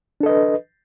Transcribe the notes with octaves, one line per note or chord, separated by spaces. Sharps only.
D4 A4 B4 D#5